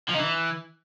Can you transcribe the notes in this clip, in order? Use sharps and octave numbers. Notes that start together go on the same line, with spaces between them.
F3
D#4
E3